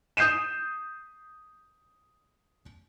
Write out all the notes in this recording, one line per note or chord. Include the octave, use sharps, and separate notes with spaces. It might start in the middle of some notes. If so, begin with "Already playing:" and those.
D#6 G6 C7 D#7 E7